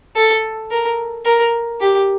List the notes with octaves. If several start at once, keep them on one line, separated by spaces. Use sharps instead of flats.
A4
A#4
A#4
G4